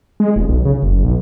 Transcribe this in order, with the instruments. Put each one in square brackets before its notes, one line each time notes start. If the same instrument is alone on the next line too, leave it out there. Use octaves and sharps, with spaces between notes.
[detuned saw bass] G#3
D#1
B1
C#3
F#1
B1